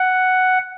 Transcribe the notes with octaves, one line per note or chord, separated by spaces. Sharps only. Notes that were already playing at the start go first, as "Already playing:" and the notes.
Already playing: F#5